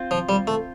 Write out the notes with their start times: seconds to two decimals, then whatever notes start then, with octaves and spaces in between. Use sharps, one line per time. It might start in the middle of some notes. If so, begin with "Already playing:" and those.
Already playing: C4 F4 C5
0.11 F3
0.29 G3
0.47 A3